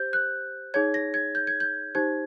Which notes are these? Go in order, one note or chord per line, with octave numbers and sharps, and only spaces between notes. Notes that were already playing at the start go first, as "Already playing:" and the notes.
Already playing: G4 C5 G6
F#6
D#4 G#4 C#5 G#6
A#6
G#6
G6
G#6
G6
D#4 G4 C5 G#6